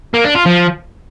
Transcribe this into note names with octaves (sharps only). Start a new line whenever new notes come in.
A#3
D4
F4
F3